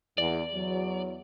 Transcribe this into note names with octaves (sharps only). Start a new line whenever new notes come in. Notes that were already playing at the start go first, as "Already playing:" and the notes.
E2 D5
E2 F#3